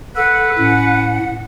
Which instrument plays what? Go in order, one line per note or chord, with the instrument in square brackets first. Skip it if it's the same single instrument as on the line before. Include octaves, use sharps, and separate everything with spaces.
[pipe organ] A4 [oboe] B4 [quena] F#5
[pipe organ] A2 [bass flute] C#4